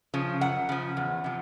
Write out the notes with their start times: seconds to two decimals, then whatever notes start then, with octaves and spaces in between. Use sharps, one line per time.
0.14 C#3 F3
0.41 F#2 F#5
0.69 C#3 F3
0.97 E2
1.24 C3 F3